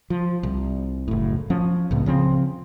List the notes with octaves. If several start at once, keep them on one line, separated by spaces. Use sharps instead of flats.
F3
C2
F#1 A2
F3 C#4
C#2 A2 C3
C#3 F3 C4